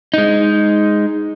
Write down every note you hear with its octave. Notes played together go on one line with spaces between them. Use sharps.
G#3 D#4